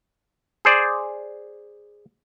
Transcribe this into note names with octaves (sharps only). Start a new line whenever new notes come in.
G#4 C5 D5